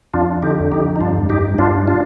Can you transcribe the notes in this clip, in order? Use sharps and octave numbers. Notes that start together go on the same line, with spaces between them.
F2 D4 F4
D3 D#4 G4
F2 D#4 G4
D#4
G2 D4 F4
G2 D#4 G4
G2 D4 F4
D4 F4